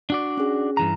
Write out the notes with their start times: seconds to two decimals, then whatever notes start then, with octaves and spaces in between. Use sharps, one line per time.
0.10 D4 F#4 D5
0.37 C#4 G#4
0.77 G2 E3 A#5